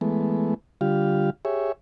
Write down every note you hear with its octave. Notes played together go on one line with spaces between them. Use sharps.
E3 G#3 A3 B3
D3 G3 F4 G4 F5
G4 G#4 C#5 E5